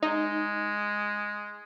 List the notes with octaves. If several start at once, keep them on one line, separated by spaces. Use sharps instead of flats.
G#3 D#4